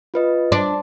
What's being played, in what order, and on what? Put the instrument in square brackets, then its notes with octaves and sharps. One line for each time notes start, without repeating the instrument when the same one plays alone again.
[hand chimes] F4 B4 D#5
[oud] D4 [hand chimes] C6